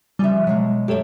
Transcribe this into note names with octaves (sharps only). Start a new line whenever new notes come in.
C#3 F3 G3 E5 G#5
B2 F#3 G#3
F#2 A3 G4 A4 C#5